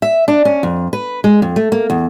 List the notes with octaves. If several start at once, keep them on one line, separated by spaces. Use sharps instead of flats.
E5
D4
C#4
F2
B4
G#3
F2
A3
A#3
E2